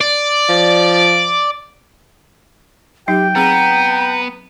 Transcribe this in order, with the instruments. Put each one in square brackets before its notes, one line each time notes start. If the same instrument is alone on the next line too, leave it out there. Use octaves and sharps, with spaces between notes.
[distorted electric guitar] D5
[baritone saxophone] F3
[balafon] F#3 D#4 [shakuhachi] G4 [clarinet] G5
[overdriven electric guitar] B3 [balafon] C4 G#4 [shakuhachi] A#5